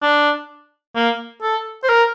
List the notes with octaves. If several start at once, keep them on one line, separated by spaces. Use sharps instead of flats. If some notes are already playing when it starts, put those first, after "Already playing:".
D4
A#3
A4
C5
A#4